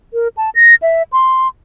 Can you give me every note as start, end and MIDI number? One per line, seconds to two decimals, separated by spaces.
0.14 0.28 70
0.37 0.50 81
0.55 0.75 94
0.82 1.03 76
1.13 1.48 84